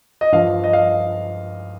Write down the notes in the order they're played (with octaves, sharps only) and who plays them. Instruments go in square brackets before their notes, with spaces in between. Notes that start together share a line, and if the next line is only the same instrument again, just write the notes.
[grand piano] D#5
G2 F3 F5
D#5
F5